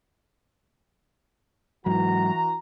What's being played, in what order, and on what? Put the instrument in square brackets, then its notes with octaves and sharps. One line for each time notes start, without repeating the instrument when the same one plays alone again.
[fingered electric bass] G#2 F#3 [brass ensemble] E3 F#4 A#5